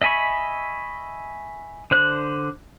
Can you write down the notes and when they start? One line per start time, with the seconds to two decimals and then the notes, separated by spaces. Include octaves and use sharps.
0.02 D#5 E5 G#5 B5 C#6
1.91 D3 C5 F#6